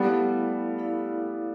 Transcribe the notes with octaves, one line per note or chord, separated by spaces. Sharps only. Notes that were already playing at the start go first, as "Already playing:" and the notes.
Already playing: G3 A3 B3 E4 A4 D5 F5
A3 E4 A4 D5 F5